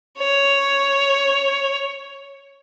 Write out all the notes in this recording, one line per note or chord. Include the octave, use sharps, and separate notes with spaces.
C#5